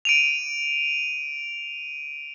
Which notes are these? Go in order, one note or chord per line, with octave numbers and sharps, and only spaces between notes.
D7 D#7 F7